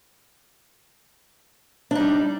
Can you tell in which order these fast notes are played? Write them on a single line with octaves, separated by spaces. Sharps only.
D4 D#4 G3